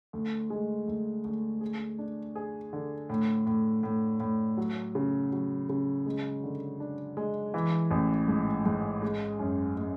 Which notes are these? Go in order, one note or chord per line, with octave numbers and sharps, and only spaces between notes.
D2
G#3
D2
D2
G#4
D4
G#4
D3
A2
A2
A2
A2
F#3
C#3
F#3
C#3
G#3
D3
D4
G#3
E3
A1
G#2
G#2
G#3
F#2
G#3